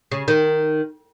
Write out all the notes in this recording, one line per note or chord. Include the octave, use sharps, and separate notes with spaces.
C#3
D#3